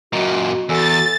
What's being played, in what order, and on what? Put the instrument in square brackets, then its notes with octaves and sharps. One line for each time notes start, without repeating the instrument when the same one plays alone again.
[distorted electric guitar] F#2 A#2 [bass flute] F#4 [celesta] D#5
[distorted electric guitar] E2 [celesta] A4 G#5 E6 [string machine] A6